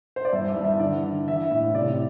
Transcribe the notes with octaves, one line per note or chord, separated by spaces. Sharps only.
C5
D5
G2 E5
E5
G2
E5
D3 D5
D3
E3 E5
A2 E5
C3 D5